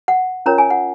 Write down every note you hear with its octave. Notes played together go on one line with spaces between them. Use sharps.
F#5
C#4 F4 A#4 C#5 A#5
G#5
F#5